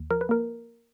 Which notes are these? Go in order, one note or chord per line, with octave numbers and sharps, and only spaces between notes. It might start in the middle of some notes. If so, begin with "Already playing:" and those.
Already playing: D#2
F3 A#4
B4
A#3 A#4